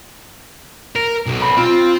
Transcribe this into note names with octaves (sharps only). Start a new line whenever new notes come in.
A#4
B1
C3 B5
C4 F4